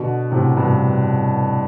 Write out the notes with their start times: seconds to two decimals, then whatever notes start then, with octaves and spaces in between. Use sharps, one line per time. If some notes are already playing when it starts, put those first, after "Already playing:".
Already playing: B2 D3
0.32 A2 C3
0.57 G2 B2